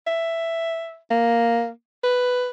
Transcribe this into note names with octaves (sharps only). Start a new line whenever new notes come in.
E5
A#3
B4